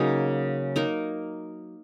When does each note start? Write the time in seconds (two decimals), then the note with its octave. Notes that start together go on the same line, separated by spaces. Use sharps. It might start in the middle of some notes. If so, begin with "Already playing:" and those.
Already playing: C#3 F#3 A#3 D#4
0.76 A#3 D#4 A#4